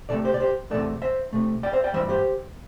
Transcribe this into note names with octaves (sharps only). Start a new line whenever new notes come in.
C3 A3 A4 D5
G4 C5
D5
G4 C5
E2 C3 E3 A3 A4 D5
C5 E5
C3 A3
D5 G5
C5 E5
D5 G5
G2 E3 G3 C5 E5
G4 C5